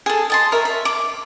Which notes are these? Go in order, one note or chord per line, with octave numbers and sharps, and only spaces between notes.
G#4 A4
D#5 A5 C6
A#4 C#5 E5
E5
D6